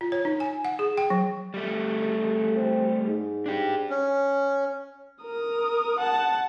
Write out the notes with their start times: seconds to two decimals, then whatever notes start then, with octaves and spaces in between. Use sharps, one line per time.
0.01 F4
0.12 C#5
0.25 D#4
0.40 G#5
0.65 F#5
0.79 G#4
0.98 G5
1.10 F#3
1.54 G3 A3
2.01 A2
2.56 C4
3.07 G#2
3.46 D4 G4
3.90 C#4
5.23 A#4 D#6
5.99 F#5 A5